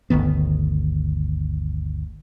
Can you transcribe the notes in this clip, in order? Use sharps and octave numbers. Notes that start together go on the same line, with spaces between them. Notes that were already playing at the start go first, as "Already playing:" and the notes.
G1 D2 D#3 B3